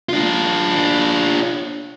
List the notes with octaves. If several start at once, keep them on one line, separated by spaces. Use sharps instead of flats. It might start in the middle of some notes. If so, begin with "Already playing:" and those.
D4 F4